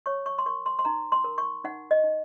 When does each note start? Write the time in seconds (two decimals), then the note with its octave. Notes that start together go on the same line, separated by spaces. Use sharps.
0.06 C#5 C#6
0.26 C#6
0.38 C6
0.46 A#4 C#6
0.66 C6
0.79 C6
0.85 D#4 A#5
1.12 C6
1.24 A#4
1.38 C#6
1.64 D#4 F#5
1.91 D#5
2.04 D#4